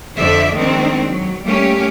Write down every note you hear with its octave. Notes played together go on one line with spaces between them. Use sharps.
F2 D3 F3 C5 D5 E5
D#3 F3 G#3 A#3 C4 D4
F#3
G3 A3 A#3 C#4 G4